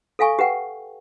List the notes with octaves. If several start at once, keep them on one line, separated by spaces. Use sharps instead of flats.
A4 E5 F5 G#5 C#6
G4 B4 F#5 G5